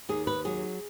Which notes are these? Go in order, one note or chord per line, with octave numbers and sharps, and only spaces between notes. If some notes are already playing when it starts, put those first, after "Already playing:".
D#2 G#4
B4
F#3 G#4